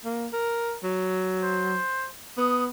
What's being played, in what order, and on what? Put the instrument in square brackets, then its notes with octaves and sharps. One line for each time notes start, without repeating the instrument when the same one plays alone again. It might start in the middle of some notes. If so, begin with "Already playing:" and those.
[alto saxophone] A#3
A#4
F#3
[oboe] C5
[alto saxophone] B3 [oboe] D#6